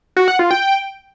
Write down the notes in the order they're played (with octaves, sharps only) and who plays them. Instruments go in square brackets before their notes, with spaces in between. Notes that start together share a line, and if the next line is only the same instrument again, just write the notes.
[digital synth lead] F#4
F#5
F4
G5